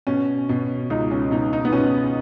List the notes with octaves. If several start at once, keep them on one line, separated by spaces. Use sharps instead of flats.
B2 C#4
B2
C#2 D#4
C#4
B2 D#4
D#4
B3
B2 C#4